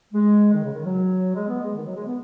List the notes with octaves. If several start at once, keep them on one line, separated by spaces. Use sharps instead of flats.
G#3
D#3
C#3
D#3
F#3
G#3
B3
G#3
D#3
F#3
G#3
B3